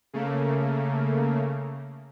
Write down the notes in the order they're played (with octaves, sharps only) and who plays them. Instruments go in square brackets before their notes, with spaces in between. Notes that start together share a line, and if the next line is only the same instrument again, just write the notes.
[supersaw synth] C#3 A3 A#3